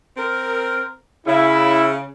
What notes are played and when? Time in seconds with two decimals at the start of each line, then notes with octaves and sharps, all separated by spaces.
0.17 C4 A#4
1.26 C#3 E4